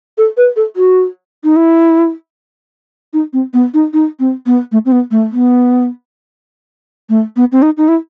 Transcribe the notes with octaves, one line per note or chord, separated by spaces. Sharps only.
A4
B4
A4
F#4
D#4
E4
D#4
C4
B3
D#4
D#4
C4
B3
A3
C4
B3
A3
B3
A3
B3
C4
D#4
D#4
E4